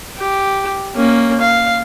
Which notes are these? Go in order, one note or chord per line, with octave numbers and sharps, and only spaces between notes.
G4
A#3 C#4
F5